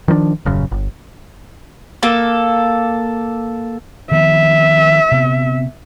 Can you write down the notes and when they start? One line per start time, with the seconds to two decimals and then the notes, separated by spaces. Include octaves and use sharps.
0.08 D#3 F3 G#3 D4
0.45 D#1 F#2 C#3
0.71 G1
2.03 A#3 A4
4.11 D#3 F3 B3 E5
5.11 C3 B3